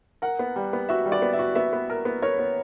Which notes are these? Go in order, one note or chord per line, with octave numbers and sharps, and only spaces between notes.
A#4 F#5
B3
G3
B3
F#4 E5
G3
D5
B3
E5
F#4
B3 E5
B3
A#4
B3
A#4 C#5
B3